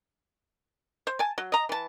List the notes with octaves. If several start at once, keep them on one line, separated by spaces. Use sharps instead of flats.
C5
G#5 A5
F#3
D#5 A#5
E3 A5